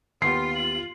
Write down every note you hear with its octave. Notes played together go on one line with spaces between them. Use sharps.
D#2 B3 F4 G4 C6 C7
F#7